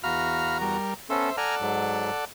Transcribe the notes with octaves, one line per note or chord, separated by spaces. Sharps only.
E2 F#4 F5 A#5 B5 F6
G3 A#4
B3 C#4 A4 C5 E5
A4 D5 F#5 G#5 A#5 F6
G#2 F#3